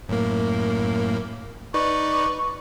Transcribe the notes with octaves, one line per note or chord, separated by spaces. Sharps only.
F#2 A2 A#3
D#4 B4 D5 C#6